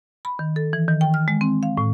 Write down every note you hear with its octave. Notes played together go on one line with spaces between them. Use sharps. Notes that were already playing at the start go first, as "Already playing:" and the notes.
B5
D#3
A4
E3
D#3
G5
F6
G#3
C4
F5
A2